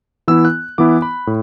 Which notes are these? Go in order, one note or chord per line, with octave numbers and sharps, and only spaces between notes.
E3 B3 E4 E6
F#6
E3 B3 E4 D6
B5
A2